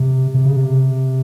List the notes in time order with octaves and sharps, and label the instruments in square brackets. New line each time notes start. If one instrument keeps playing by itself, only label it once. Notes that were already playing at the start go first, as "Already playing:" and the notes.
Already playing: [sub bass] C3
C3
C#3
C3